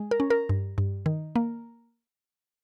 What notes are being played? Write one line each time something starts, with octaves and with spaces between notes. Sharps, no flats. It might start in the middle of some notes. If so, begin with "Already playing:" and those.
Already playing: G#3
A#4
C#4
A#4
G2
G2
D#3
A#3